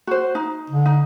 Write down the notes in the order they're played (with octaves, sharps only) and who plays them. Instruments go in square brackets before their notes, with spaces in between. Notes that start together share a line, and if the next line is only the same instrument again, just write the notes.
[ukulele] F#4 C5
D#4
[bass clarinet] D3
[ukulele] D#4